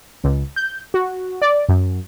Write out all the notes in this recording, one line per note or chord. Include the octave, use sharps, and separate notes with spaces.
C#2
G6
F#4
D5
F#2